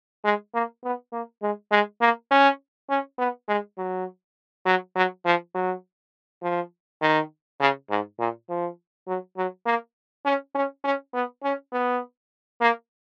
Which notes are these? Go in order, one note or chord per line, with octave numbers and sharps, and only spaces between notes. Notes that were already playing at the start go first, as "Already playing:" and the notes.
G#3
A#3
B3
A#3
G#3
G#3
A#3
C#4
C#4
B3
G#3
F#3
F#3
F#3
F3
F#3
F3
D#3
C#3
G#2
A#2
F3
F#3
F#3
A#3
C#4
C#4
C#4
B3
C#4
B3
A#3